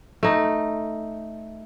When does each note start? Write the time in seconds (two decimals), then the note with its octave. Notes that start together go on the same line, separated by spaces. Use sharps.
0.23 A3 D#4